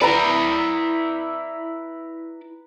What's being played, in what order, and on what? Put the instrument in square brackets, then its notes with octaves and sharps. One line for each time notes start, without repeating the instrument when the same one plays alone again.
[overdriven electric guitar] E4 D5 [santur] B4 A#5